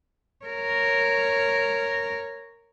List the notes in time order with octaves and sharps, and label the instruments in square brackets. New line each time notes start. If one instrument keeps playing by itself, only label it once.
[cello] A#4 C#5